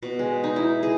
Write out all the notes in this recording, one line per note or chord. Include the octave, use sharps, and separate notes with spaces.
B2
G#3
D#4
E4
G#4